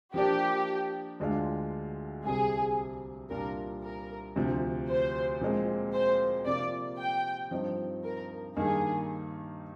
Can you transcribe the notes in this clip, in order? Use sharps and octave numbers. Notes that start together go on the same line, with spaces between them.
F3 A#3 D4 G4
D2 D3 G#3 D4 F4
C2 C3 G3 G#4
C2 A#2 G3 D4 F4 A#4
A#4
D2 C3 F3
C5
A#2 F3 G#3 C4
C5
C3 F3 A#3 F4 D5
G5
G2 F3 C4 D#4
A#4
G2 D#3 A#3 D#4 G#4